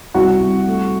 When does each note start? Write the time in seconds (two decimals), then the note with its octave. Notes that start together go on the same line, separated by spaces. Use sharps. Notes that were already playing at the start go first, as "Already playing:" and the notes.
0.14 C2 F#4
0.40 C2
0.67 A3